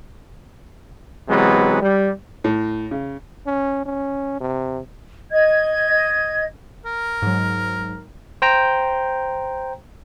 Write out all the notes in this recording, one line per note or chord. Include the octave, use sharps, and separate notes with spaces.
C3 E3 F#3 G#3 B3
G3
A2
C#3
C#4
C#4
C3
D#5 G#6
A#4
G#2 F#3
C5 G5 A#5